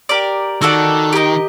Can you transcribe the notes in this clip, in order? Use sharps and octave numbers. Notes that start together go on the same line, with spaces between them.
G4 A#4 D5
D#3 F#4 A4 D5 F#5
G4 A#4 D#5